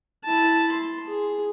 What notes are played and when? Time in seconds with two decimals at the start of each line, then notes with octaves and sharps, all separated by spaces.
0.24 E4 A5
0.72 C6
1.08 G#4